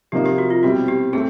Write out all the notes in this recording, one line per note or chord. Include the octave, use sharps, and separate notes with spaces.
C3 F3 A#3 D#4 G4
G4
F#4
F4
B2 G3 C4 E4 F#4
G4
A3 C4 G#4